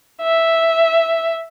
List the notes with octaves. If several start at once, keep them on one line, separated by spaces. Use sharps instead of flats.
E5